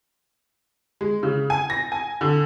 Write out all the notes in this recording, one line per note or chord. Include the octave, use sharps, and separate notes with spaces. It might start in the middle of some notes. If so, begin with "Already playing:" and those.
G#3
C#3
G#5
A#6
G#5
D3